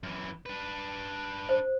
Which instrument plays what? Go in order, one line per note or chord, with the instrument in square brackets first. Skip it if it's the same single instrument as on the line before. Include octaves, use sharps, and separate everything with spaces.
[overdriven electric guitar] F#2 E3
D4 B4
[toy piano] C5